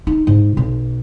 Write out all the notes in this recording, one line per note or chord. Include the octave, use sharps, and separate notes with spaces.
D#4
G#2
B1